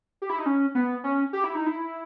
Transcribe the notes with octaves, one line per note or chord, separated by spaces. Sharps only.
G4
E4
D#4
C#4
B3
C#4
G4
E4
D#4
E4